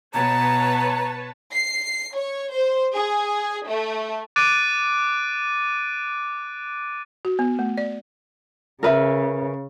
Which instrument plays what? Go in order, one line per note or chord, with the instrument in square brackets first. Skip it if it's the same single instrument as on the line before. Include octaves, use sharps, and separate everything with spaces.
[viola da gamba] B2 [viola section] B4 C#5 A5 [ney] A#5
[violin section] C7
C#5
C5
G#4
A3
[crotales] D6 F#6 A6 D7 D#7
[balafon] F#4
B3
A3
D5
[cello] C#3 [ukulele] A#4 B4 E5